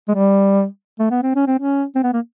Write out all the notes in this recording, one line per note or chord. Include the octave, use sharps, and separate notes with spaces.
G#3
G3
A3
B3
C4
C#4
C4
C#4
C4
B3
A#3